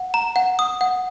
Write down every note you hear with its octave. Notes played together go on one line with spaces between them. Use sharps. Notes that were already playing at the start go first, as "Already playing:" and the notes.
Already playing: F#5
A#5
F#5
D#6
F#5